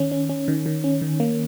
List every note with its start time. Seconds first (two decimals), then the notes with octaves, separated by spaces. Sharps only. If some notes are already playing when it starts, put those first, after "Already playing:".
Already playing: D#3 C#4
0.11 C#4
0.29 C#4
0.48 D#3
0.66 D#3
0.84 C#4
1.02 D#3
1.20 A#3